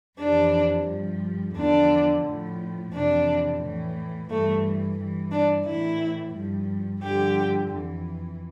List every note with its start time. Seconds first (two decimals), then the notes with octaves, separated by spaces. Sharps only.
0.19 F2 C3 E3 D4
0.87 G2 F3
1.55 E2 D3 F3 D4
2.24 A2 F3
2.92 F2 C3 E3 D4
3.61 A2 E3
4.29 G2 E3 A3
4.97 G2 E3
5.31 D4
5.65 A2 E3 E4
6.34 G2 F3
7.02 G2 D3 F3 G4
7.71 F2 E3